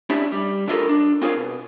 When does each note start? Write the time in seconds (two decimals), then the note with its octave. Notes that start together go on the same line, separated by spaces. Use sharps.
0.10 C#4 D4 E4 G4
0.32 G3
0.68 D3 G3 E4 F4 A4 A#4
0.89 D4
1.22 C4 F4 G#4 A#4 D5 F5
1.36 B2